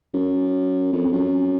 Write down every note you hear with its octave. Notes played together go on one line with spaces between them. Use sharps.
F#2
F2
F#2